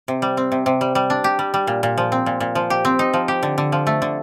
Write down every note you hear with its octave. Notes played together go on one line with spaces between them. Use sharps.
C3
G3
C4
C3
C3
G3
G3
D4
G4
G3
G3
A#2
A#2
F3
C4
A#2
A#2
F3
G4
C4
D#4
F3
G4
D3
D3
F3
A3
D3